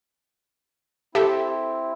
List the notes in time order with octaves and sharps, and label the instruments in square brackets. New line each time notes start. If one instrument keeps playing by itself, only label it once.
[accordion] C4 E4 [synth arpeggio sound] G4 A4 E5